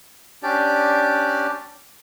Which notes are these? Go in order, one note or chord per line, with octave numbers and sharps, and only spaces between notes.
C#4 D4 G4 D5